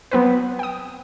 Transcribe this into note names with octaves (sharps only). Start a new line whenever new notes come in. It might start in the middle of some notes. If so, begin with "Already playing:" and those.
F#3 B3 C4 B4
G5 D#6